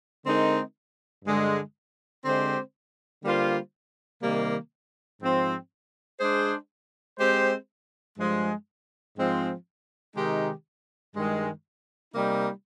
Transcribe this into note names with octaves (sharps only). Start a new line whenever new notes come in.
D3 G#3 C4 D#4 A#4
G2 D3 G#3
D3 G#3 C4 G4 C5
D3 G3 A#3 F4 C5
C3 D#3 G3 A#3
G#2 F3 C4
G#3 D4 G#4 C5
G#3 C4 G4 C5
G2 F3 G#3
G#2 F3 G#3 C4
C3 D#3 G#3 D#4 G4
G2 D#3 G#3
C3 G3 A#3 D#4